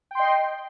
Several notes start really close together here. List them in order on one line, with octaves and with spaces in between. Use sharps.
G5 C6 D#5